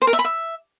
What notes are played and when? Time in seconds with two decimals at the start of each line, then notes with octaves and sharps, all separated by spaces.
0.02 C5
0.07 A#4
0.13 E5
0.19 B5
0.25 E5